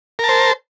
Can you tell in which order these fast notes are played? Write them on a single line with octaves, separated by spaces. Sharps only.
A#4 A5 C5